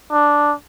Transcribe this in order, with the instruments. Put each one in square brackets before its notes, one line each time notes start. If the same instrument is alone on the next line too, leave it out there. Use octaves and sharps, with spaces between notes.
[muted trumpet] D4